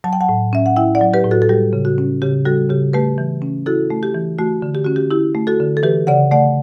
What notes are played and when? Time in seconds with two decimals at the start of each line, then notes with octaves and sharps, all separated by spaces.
0.04 F#3 A5
0.13 G5
0.21 F#5 A5
0.29 A2
0.53 C#4 E5
0.66 F#5
0.76 E4 E5 G5
0.95 D5 F#5
1.01 F#3
1.13 G4 B4
1.25 A2
1.31 F#4 A4
1.42 A4
1.49 G3 G4
1.73 C#3
1.85 F#4
1.98 C#4
2.22 C#3 G4
2.45 G3 F#4 A4
2.69 C#3 G4
2.93 A3 G4 B4
3.18 E3
3.42 C#4
3.66 E4 F#4 A4
3.90 A3
4.03 G4
4.15 E3
4.38 A3 F#4
4.62 D3
4.75 G4
4.85 C#4 F#4
4.96 G4
5.11 E4 G4
5.35 A3
5.47 F#4 A4
5.60 D3
5.77 A4
5.83 E3 G4 B4
6.07 C#3 D5 F#5
6.31 A3 D5 F#5